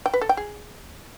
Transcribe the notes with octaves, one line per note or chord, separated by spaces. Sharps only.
G5
B4
A4
G5
G#4